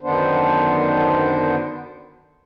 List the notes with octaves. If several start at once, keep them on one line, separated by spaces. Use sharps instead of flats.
F#2 D3 D#3 B3 D4 C5